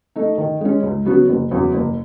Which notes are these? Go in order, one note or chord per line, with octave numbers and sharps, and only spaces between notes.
A3 D#4
D#3
G#3 C#4
C#2
C#3 F#3 B3 F#4
F#1
E2 C#3 F#3
F#1